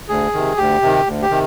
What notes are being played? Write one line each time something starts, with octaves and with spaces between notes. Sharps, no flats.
D2 G#4
C3 D#3
D2 G4
C3 D#3
D2
G4
C3 D#3